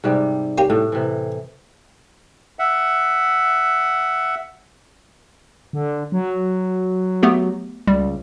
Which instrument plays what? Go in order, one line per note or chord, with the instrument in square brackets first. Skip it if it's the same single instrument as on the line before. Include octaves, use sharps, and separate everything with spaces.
[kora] G#2 C3 G3
[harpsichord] A#3 C#4 G4
[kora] A2
C3 E3
[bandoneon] E5 F#5
[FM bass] D3
F#3
[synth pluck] A3 B3 G4
[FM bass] C#2 [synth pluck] G3